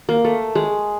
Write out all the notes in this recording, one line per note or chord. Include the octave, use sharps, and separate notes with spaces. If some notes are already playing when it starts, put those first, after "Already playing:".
A#3
A3
G#3